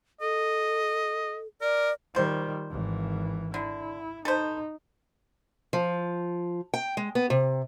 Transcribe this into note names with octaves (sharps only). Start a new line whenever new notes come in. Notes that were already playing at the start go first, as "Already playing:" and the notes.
A4 D#5
A#4 D5
D#3 F3 G3 C5
G#1 E3
D3 E4
D#4 A4 B4 C5
F3
G5
G#3
B3
C3